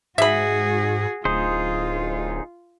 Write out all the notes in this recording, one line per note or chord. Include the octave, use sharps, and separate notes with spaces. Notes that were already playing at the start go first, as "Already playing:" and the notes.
G#2 F#4 G#4 E5 B5
D1 D#4 F4 G#4 C5